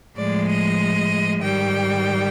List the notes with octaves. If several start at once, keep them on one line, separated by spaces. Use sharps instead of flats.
A2 F3 G#3 D5
D#5
G#2 D#3 G3 G5